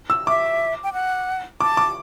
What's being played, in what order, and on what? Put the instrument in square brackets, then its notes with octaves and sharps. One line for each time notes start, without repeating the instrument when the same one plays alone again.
[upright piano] E6
[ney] E5 [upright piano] D6
[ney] G5
F#5
[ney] A5 [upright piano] D6
[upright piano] D6